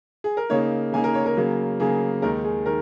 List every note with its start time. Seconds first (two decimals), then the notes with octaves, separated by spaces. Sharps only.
0.24 G#4
0.37 A#4
0.50 C#3 A#3 D#4 C#5
0.93 C#3 A#3 D#4 G#5
1.04 A#4
1.14 C#5
1.26 A#4
1.37 C#3 F#3 A#3
1.80 C#3 F#3 A#3 G#4
2.22 D#2 D#3 G#3 D#4 A#4
2.44 G#4
2.66 D#3 A#4